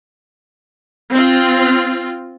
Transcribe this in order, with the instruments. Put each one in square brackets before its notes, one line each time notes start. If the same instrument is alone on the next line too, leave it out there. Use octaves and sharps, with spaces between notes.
[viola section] C4 F4